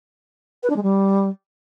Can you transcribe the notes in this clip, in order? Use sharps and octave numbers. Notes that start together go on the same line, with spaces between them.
B4
D4
G#3
G3